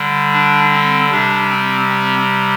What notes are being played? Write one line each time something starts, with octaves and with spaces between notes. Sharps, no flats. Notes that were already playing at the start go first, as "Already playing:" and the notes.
Already playing: D3 G3
D4
C4
C3 G3 D4
C4
C4